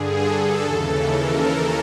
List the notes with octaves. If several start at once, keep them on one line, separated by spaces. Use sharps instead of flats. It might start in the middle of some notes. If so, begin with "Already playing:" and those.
Already playing: G2 D3 G#4
A4
D#2 C#3 E3
A#4